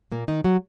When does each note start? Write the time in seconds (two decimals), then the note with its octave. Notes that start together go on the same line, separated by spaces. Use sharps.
0.12 A#2 A#3
0.28 D#3 D#4
0.44 F#3 F#4